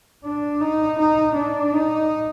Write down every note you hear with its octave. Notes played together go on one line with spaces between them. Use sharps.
D4
D#4
D#4
D4
D#4